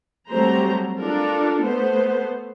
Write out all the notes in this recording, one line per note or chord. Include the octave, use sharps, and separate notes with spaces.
F#3 G3 A3 C4 C5 A#5
D4 F4 A4 A#4
A3 B3 C5